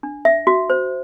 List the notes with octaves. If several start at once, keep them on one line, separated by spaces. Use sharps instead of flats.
D4
E5
F#4
C5